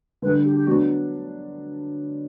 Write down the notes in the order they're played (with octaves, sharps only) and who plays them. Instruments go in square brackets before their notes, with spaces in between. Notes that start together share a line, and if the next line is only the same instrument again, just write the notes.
[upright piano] D3 G3 D4 [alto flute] B4
[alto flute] G4
G4
[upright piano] F#3 B3 D4 [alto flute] F#4